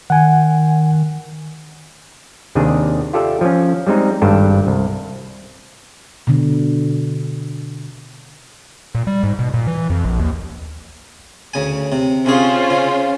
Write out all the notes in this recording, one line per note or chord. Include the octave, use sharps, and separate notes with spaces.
D#3 F#5 G#5
D#2 C3 D#3 D4 G#4
F4 G4 A4 D5 E5
F3 C#4
G3 G#3 C4 D#4
G#1 G2 A4 D5 G5
C2
B2 D3
A#2
G3
G#2
B2
A#2
E3
F2
A#1
D#2
D2 C#3 G#5
C3
C3 C#4 F4 G#4 C5
C#3